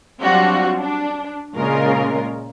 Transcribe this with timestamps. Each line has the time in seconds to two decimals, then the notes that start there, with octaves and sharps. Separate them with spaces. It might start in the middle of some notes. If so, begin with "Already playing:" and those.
0.21 F#3 G3 C4 D4 F4 F#4
0.79 D4
1.55 A#2 C#3 G#3 C#4 F4 A#4